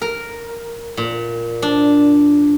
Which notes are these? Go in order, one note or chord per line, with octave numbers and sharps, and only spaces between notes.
A#4
A#2
D4